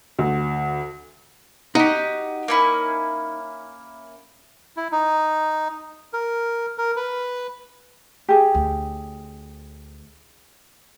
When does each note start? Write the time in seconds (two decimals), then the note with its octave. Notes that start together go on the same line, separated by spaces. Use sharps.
0.19 D2
1.75 D#4 F#4 G4
2.48 A#3 C#4 E4
4.77 E4
4.92 D#4
6.13 A#4
6.78 A#4
6.96 B4
8.28 G4 G#4
8.55 D2